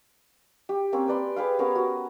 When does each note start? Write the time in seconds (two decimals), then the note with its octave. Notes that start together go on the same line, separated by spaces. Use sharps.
0.69 G4
0.92 A#3 C4 C#4
1.08 B4 D5 C6
1.36 G4 G#4 B4 F5
1.59 B3 C#4 A#4 F5
1.75 F#4